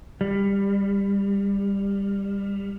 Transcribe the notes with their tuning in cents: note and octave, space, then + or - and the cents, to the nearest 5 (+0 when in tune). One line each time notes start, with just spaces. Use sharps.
G3 +20